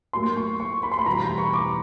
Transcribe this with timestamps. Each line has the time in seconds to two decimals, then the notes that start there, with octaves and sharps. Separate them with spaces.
0.13 A2 F#3 A#3 C6
0.37 C#6
0.60 C#6
0.83 B5
0.92 C6
0.99 B5
1.06 E2 B2 G3 A#5
1.21 B5
1.38 C#6
1.53 D6